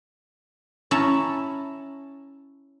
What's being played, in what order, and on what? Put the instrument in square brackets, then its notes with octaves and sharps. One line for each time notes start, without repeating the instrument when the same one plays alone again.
[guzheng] C#4 E4 A5 A#5